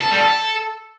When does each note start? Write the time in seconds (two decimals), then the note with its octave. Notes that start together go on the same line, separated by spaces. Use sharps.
0.01 A4
0.11 G3
0.20 A4